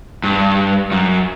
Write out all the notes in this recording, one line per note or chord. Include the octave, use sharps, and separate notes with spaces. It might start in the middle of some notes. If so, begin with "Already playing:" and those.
G2
F#2